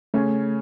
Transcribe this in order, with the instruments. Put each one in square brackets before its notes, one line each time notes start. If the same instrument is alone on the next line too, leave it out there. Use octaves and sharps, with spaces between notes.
[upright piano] C#3 C#4 [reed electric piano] A3